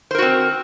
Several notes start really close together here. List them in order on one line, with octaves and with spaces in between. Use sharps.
C5 A#4 F#4 C4